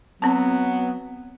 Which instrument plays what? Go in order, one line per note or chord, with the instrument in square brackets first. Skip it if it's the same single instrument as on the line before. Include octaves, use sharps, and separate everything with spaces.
[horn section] F#3 B3 [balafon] C4 A5